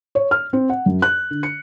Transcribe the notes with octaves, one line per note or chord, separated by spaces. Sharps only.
C#5
F6
C4
F#5
F#2
F#6
D3
C#7